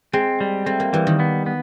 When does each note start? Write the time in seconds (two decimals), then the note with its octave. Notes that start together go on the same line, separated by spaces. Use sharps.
0.13 G#3 C4
0.41 G3
0.66 A3 C4
0.80 A#3
0.93 E3 G3
1.07 D#3
1.20 B3
1.46 B3